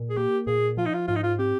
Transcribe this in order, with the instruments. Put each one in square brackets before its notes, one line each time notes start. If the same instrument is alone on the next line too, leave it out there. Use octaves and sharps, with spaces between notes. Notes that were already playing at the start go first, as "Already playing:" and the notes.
Already playing: [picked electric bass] A#2
[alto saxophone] G#4
[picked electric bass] A#3 [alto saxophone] G4
[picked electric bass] A#2 [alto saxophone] G#4
[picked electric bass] F3 [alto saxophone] F4
[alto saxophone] D#4
F4
[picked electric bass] G#2 [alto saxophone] F4
[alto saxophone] D#4
F4
[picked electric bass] C4 [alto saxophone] G4